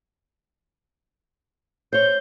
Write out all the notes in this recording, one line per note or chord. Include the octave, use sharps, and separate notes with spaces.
C5 C#5 G6